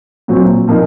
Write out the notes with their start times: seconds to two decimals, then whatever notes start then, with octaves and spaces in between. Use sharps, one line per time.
0.28 A#2 F#3 C4
0.68 A#2 F3 A#3 D#4